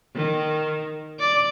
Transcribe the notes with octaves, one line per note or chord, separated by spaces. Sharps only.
D#3
D5